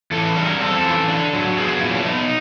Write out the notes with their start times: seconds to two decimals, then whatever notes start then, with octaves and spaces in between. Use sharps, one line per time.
0.11 E3 A4
0.25 B4
0.35 G3 A#4
0.60 C4 A4
0.85 E3
1.08 D4
1.33 F#3
1.57 B3 G#4
1.81 A#2 E4
1.95 D4
2.05 B2 D#4